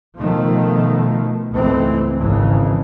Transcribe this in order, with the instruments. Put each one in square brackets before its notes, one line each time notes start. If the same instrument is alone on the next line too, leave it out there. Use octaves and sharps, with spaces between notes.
[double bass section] B2 D#3 F3 A3
C#2 G#2 E3 A3 C4
G#1 C#3 E3